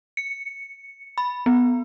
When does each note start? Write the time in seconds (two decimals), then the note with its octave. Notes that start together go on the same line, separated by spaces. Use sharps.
0.17 C#7
1.18 B5
1.46 B3